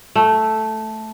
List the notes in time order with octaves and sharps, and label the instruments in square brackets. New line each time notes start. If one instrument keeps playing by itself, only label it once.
[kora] A3